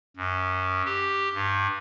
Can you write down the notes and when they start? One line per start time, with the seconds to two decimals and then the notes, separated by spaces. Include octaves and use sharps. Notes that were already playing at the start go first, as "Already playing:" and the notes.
0.17 F#2
0.85 G4
1.34 G2